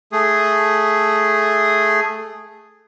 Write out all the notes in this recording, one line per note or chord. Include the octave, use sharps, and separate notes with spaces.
A3 G#4